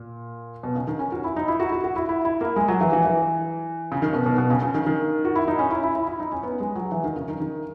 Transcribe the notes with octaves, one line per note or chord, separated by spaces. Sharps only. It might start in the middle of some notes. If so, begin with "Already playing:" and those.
Already playing: A#2
B2
C#3
D#3
C#4
F#4
E4
D#4
E4
F#4
F#4
F#4
E4
E4
E4
A#3
G#3
F#3
E3
E3
E3
C#3
D#3
B2
B2
B2
C#3
C#3
D#3
D#3
F#4
E4
D#4
C#4
E4
E4
E4
E4
D#4
C#4
B3
G#3
F#3
E3
D#3
C#3
D#3
D#3